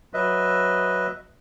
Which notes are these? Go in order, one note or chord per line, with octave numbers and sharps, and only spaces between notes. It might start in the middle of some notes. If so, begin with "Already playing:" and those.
F#3 B4 D#5 E5